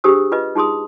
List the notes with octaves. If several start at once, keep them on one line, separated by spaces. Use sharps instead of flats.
D4 G4 G#4 C5 D#6 E6
F4 B4 D#5
D#4 F4 G#4 C6 D#6